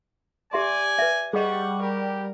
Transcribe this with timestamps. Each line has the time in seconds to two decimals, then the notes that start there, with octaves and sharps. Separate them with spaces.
0.53 G4 D5 E5 G#5 C6
0.99 B4 E5
1.33 G3 G#4 D#5 F#5 C#6
1.82 G4 A#4